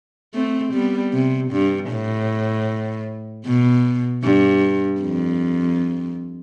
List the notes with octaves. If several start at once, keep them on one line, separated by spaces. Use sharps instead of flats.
A3 C4
G3 B3
C3
G2
A2
B2
G2
F2